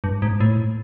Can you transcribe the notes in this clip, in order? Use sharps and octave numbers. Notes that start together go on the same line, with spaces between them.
G2
G#2
A2